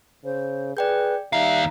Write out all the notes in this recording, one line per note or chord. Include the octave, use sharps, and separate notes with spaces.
C#3 C5
G#4 B4 D5 G5 G6
D#2 G3 D#4 E5 F5 A#5